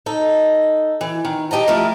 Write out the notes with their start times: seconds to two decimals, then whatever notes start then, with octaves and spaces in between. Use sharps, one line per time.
0.06 D#4 A4
1.01 E3
1.25 D#3
1.51 G4 D#5 A5 A#5
1.68 F3 A3 E4 A#4